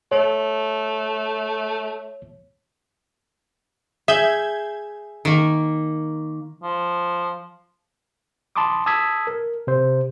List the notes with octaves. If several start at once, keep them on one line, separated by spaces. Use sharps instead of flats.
A3 C#5
G#4 E5 G6 G#6
D#3 A#3
F3
A5 B5 C6 D6 D#6
A5 D#6 E6 G#6 B6
A#4
C3 C5